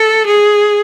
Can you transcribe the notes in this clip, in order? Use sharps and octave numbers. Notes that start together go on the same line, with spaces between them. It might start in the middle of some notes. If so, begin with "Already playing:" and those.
Already playing: A4
G#4